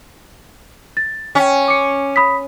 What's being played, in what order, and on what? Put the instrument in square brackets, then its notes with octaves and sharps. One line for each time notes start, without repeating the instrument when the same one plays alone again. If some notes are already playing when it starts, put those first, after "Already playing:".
[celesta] A6
[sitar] C#4 [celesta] G5 G#5
[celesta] D6 C#7
B5 D#6 B6